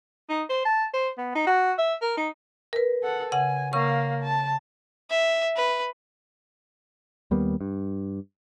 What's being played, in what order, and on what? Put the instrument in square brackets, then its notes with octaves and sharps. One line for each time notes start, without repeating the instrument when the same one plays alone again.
[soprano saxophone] D#4
C5
A5
C5
B3
D#4
F#4
E5
A#4
D#4
[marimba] A#4 B4
[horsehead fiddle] A4 F#5
[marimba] C#3 F#5 [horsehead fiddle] G#5
[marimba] C#3 C#6 [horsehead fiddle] A#3 F5
[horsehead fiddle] A5
[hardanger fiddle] E5
B4
[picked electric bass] D#2 G3 A#3 B3
G2